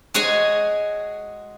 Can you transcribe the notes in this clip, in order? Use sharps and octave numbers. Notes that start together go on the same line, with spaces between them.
G#3 F#4 G#4 C#5 G#5